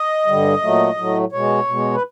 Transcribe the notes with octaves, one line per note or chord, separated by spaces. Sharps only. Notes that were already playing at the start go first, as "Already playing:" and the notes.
Already playing: D#5
G2 D3 G3
A#2 F#3 A3
A2 F#3 A3
B2 G#3 C#5
B2
G#3
B4